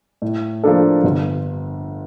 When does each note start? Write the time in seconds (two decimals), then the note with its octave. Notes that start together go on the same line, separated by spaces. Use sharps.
0.22 A2
0.64 F3 A#3 D4 A4
1.04 G1